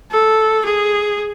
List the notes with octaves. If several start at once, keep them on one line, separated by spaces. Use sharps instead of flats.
A4
G#4